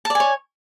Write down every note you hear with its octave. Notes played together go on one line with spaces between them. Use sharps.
C#5 D5 G#5 A5